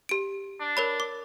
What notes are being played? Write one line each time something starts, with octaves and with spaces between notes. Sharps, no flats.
G4 D7
D4
A#4 C#5 B5
D6